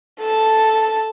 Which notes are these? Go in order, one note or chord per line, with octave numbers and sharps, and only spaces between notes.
A4 A5